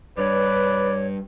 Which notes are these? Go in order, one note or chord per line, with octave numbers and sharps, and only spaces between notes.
G2 B4 C#5 D5